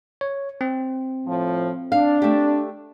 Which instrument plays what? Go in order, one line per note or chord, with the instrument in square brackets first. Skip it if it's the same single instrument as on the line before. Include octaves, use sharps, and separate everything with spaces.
[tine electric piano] C#5
C4
[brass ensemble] A2 F3
[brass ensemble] D4 [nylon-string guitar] F5
[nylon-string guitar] A3 G4